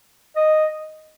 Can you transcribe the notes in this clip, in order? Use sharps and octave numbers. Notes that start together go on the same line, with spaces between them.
D#5